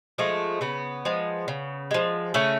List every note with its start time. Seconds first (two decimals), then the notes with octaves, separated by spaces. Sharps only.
0.18 F3 G#3 A3
0.61 C#3 B3
1.05 F3 G#3
1.48 C#3
1.91 F3 G#3
2.34 C#3 A3 C#4